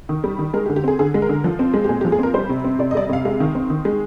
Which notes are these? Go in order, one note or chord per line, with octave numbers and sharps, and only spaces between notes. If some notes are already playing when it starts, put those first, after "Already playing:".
D#3
G3
D#3
G#3 A#4
G4
D3
G4
C4 G#4
D3 G#4
G#3
A#4
D3
F3
C4
G#3
G4
A#2 G#4
G4
F3
G#4
C4 A#4
G3 C5
C3
C4
C3 D5
D#5
G3 D5
D#5
C3 F5
G#3 F5
D#3
C4
D#3
G#3